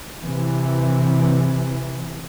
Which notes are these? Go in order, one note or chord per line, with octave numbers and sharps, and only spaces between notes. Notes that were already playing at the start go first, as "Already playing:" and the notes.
C3 E3